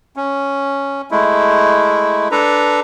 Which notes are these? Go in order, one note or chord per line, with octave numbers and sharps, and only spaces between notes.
C#4
G#3 A3 E4
D4 A4 B4 A#5